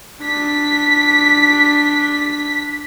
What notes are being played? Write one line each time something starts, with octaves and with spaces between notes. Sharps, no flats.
D4 B6